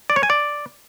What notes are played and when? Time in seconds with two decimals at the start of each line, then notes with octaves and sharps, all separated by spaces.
0.10 D5
0.16 C#5
0.23 G#5
0.30 D5